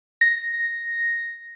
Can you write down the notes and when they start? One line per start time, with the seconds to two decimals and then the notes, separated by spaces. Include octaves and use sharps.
0.21 A#6